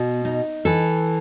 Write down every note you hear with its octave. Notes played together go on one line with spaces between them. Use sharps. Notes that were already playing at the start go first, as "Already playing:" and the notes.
Already playing: B2
D#4
E3 A4